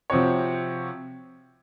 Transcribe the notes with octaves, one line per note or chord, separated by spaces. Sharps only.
C3 F3 C4 F#4 C#5